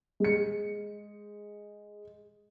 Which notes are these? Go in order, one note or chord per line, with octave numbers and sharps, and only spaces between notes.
G#3 C#7